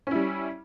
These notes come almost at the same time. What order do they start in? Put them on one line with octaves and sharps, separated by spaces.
C#4 E4 G3